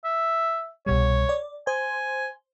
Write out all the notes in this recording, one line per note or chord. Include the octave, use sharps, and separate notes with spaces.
E5
C2 B2 G3 C#5
D5
C5 G#5